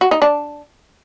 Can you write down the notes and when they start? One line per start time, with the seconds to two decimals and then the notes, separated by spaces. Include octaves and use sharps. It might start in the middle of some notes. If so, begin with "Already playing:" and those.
0.01 F#4
0.11 D#4
0.22 D4